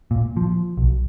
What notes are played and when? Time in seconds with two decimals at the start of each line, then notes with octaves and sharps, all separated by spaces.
0.11 A#2
0.37 F3
0.77 B1